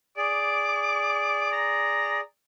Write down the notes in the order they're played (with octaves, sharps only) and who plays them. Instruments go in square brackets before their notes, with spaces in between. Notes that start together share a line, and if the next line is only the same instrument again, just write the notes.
[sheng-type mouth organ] G#4 D5 [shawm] D6
[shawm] A#5